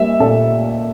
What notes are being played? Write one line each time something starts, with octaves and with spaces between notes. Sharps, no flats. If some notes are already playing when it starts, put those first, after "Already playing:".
Already playing: G3 A#3 E5
A#2 A4